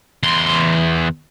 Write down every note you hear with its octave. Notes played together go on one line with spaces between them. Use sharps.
E2 C6